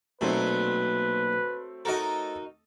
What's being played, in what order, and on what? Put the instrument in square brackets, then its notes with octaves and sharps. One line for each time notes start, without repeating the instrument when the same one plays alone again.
[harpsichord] B1 A#2 [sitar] F#3 [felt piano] A3 C4 [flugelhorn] B4
[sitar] D#4 F#4 A#4 [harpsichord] A4 D#5